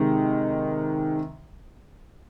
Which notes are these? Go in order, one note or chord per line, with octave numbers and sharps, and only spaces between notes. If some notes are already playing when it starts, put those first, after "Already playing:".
Already playing: C3 D#3 G#3